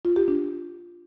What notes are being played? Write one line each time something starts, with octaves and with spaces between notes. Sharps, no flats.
F4
G4
D4